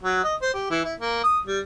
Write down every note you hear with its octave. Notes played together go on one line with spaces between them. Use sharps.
F#3
D#5
C5
G4
E3
E4
A#3
D#6
G3